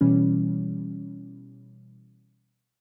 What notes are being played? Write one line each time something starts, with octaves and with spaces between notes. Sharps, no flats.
B2 E3 G3 C#4